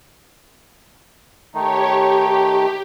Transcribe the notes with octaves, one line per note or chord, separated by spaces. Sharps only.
D#3 A3 D#4 G4 C#5
G4